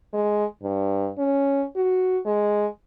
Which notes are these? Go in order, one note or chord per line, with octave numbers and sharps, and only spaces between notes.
G#3
G2
C#4
F#4
G#3